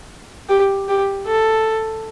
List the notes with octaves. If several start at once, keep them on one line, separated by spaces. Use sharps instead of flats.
G4
G4
A4